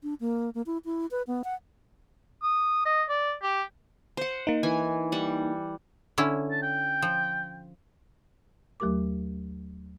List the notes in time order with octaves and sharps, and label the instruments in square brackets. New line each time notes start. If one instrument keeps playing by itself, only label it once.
[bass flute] D4
A#3
A#3
E4
E4
B4
B3
F#5
[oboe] D#6
D#5
D5
G4
[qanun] C5 F#5
[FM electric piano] A#3 D#4
[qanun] E3 G#5
G3 F#5
[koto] D3 C#4 E4
[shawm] A5
G5
[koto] F3
[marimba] D#2 F#3 A3 G4 A#4 D6